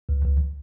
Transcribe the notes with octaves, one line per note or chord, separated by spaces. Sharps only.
C#2
C#2